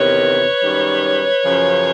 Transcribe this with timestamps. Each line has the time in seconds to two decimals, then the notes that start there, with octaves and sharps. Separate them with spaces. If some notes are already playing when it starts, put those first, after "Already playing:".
Already playing: E2 C3 D#3 B4 C#5
0.62 F#2 D#3 G3
1.45 F#2 C#3 F3